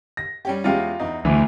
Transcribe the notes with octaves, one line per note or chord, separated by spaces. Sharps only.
A#6
G3 C#4 G4
E2 G#3 C#4 F4 G4
E2 D#4
D2 E3